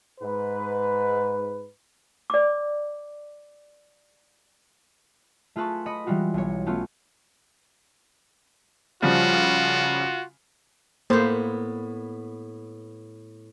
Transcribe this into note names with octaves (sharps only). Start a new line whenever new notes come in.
G#2 B4
D5 D6
A3 F4 G#4 B4 A5 C#6
D#5 B5 D#6 C#7
E3 G3 G#3 F4 F#4
B1 C#5
A3 B3 C#4 F4
C#3 F3 G3 F4 F#4
A2 A#3 B3 C5